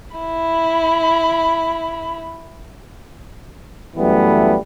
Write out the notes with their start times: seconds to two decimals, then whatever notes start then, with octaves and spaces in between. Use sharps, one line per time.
0.16 E4 B5
3.97 F#2 E3 G3 A3 B3